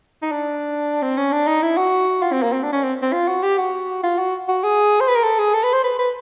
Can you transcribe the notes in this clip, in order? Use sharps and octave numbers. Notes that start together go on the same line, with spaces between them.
D#4
D4
C4
C#4
D4
D#4
E4
F#4
F4
C4
A#3
C4
D4
C#4
C4
C4
F4
F#4
G4
F#4
F4
F#4
F#4
G#4
C5
B4
A#4
A4
G#4
A4
B4
C5
B4
B4